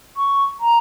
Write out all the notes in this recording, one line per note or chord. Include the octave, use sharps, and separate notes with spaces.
C#6
A#5